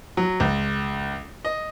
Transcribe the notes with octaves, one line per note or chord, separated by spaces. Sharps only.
F#3
C#2
D#5